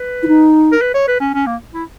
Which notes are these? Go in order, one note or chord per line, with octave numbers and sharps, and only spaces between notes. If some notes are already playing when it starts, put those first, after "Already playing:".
Already playing: B4
E4
D#4
A#4
B4
C#5
B4
C#4
C#4
A#3
E4